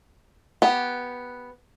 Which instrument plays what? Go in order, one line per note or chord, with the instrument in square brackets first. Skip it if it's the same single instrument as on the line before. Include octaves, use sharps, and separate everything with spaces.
[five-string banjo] B3 G4